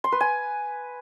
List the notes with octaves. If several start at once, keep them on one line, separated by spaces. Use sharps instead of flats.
C6
B4
G#5